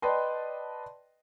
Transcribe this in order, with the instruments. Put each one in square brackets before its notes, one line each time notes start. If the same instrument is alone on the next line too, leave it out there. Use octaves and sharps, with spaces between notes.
[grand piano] B4 D5 D#5 G5 A5 C6